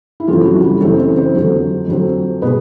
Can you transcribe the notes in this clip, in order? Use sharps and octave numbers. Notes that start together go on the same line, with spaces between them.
E4
F#2 C#3 E3 F3 A3 C4 F4
F#3 F#4
G3 G4
F#2 C#3 E3 A3 C4 A4
C4 C5
C4 C5
F2 D3 F#3 A3 C4
F2 D3 F#3 A3 C4
B2 G#3 B3 B4